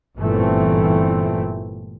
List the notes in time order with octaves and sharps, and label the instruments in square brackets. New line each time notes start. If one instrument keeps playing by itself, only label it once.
[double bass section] G1 A#2 E3 A3 C4